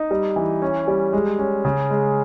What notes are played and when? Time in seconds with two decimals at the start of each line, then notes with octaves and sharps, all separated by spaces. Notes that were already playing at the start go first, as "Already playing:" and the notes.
Already playing: D#4
0.11 G3
0.36 E3
0.62 C#4
0.88 G3
1.13 G#3
1.39 C#4
1.65 C#3
1.90 G#3